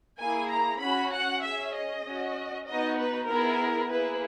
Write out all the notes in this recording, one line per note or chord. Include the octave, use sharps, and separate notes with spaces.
A#3 E4 G#4 G#5
A#5
C#4 F#4 B5
F#5
C#4 G#4 E5
D#5
C#4 F#4
B3 D#4 F#4 D#5
B4
B3 E4 G#4 A#4
A#3 E4 G#4 B4